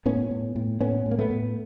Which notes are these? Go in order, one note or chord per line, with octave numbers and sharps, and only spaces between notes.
A2 B3 C#4
A2
A2
A2 B3 C#4
A2
A#3
A3 B3
A2